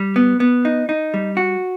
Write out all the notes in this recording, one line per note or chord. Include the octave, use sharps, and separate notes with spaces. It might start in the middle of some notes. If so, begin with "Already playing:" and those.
Already playing: G3
B3
B3
D#4
D#4
G3
F#4